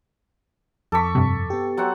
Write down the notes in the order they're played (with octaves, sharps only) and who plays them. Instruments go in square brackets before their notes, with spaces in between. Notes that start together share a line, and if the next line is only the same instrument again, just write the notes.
[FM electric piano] F2 D6 B6 [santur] A4 C#6
[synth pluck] G2 C3
[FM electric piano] B3 G4
[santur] F#3 C4 F#5